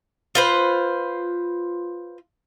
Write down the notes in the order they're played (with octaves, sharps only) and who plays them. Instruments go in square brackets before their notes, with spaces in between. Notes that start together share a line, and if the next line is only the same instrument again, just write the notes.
[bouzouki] F4 B4 C5